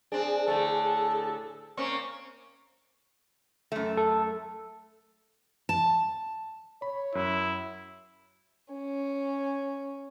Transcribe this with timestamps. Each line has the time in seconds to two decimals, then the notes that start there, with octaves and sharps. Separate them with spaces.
0.12 C4 D4 G#4
0.48 A2 D3 A3 A4
1.77 A#3 C4 C#4 C#6
3.72 F#2 A3
3.97 A4
5.69 A5
6.82 C#5 B5
7.15 F#2 E4
8.74 C#4